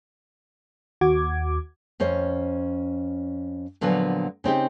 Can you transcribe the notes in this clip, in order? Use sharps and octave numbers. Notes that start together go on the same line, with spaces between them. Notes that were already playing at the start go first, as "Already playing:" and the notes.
D#2 F#4 D6 G#6
F2 C#4 C5 C#5
A#2 D3 F3 F#3 B3 G#5
C#3 C4 D#4 G4